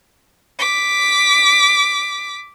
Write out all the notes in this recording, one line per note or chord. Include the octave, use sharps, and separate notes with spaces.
D6 B6